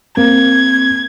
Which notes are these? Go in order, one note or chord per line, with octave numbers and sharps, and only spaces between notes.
A#3 C4 G#6